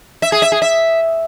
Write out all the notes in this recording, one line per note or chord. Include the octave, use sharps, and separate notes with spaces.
E5
G#4
E5
G#4
E5